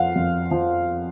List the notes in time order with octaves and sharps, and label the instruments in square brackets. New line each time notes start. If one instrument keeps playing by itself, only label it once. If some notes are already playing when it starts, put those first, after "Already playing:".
Already playing: [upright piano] F2 F3 F5 F#5
F2
F3